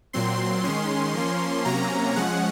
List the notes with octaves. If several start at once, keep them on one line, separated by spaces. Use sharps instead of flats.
A#2 F#3 C4 C6
D#3 G#3 C#4 C6
F3 A#3 C#4
C3 F#3 A#3 C#4 A#5
F3 G#3 C#4 F#5